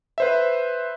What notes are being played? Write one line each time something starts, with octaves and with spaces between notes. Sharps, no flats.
B4 C5 E5